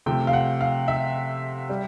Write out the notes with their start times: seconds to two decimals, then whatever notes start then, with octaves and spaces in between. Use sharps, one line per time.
0.06 C3 F3 A3 G5
0.27 F5
0.33 F#5
0.61 F5
0.88 E5
1.69 G3